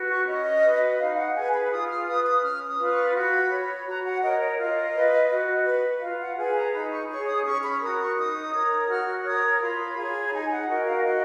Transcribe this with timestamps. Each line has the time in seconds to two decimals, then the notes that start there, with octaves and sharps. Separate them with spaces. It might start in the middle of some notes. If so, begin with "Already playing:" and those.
Already playing: F#4 B4
0.09 C#6
0.27 C#4 D#5
0.63 F#4 B4
0.99 D#4 F5
1.18 F#5
1.35 G#4 B4 G#5
1.53 B5
1.71 F4 D#6
1.89 F6
2.06 B4 D#6
2.25 D#6
2.42 C#4 F6
2.67 D#6
2.79 F4 B4
2.90 C#6
3.14 F#4 B5
3.50 C#5
3.86 F#4 A#5
4.05 F#5
4.22 A#4 C#5 D#5
4.40 C#5
4.58 F4 D#5
4.94 B4
5.30 F#4
5.66 B4
6.02 F4 F5
6.19 F#5
6.38 G#4 B4 G#5
6.56 A#5
6.74 D#4 B5
6.92 C#6
7.09 G#4 C#5 C#6
7.27 D#6
7.45 C#4 C#6
7.63 B5
7.81 F#4 A#4 D#6
7.99 C#6
8.17 D#4 D#6
8.54 A#4 C#5
8.89 F#4 F6
9.24 A#4 C#5 D#6
9.61 F4 B5
9.97 G#4 C#5
10.28 A#5
10.32 D#4 G#5
10.51 F#5
10.68 F#4 A#4 D#5
10.86 F5
11.05 F#4 D#5